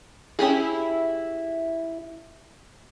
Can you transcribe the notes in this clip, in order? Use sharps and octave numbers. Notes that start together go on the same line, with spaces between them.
C#4 E4 G4 G#4